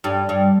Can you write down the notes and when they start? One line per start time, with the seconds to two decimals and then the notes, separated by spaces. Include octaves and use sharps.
0.04 G2
0.29 G2